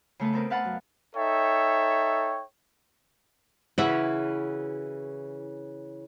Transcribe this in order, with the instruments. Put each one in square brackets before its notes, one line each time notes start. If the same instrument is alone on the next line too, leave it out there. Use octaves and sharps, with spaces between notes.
[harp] C#3 A3 B3 B4
B3 C4 A#4 B4
B4 F5 F#5 A5 B5
F#2
[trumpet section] D#4 A4 C#5 E5 G5
[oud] C#3 E3 F#4 [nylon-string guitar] E4 C#5 E5